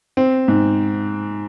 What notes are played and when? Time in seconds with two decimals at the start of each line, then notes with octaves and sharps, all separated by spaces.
0.17 C4
0.48 G#2